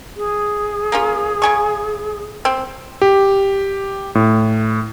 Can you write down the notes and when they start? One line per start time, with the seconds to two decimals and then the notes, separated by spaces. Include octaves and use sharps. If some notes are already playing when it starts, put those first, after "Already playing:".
0.17 G#4
0.92 A#3 C#4 F4
1.42 C#3 G#5 C#6
2.45 C4
3.02 G4
4.15 A2